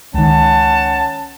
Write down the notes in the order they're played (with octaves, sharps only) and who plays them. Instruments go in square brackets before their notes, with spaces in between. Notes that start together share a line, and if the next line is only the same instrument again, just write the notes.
[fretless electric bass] C#2 D#3 [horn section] C#4 F#5 A5